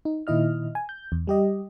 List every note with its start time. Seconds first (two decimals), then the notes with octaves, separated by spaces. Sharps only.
0.05 D#4
0.27 A#2 D#3 E4 D#5 F6
0.75 G#5
0.89 G6
1.12 E2
1.27 G3 G4 D#5